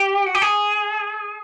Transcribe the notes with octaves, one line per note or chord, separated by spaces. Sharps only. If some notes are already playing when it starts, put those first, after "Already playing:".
Already playing: G4
F#4
G4
G#4